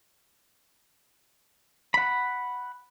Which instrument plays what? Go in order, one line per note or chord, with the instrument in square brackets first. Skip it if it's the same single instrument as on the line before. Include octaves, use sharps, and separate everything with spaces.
[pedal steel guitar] F#5 B5